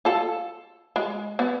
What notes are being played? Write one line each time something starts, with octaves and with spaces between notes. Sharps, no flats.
F4 A4
G#3
B3